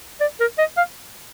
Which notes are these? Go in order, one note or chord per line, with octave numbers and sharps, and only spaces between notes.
D5
A#4
D#5
F5